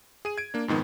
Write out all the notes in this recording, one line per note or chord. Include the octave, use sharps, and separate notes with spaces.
G#4 D#7
G#6 D7
A#3 D4
F2 G#2 D#3 B3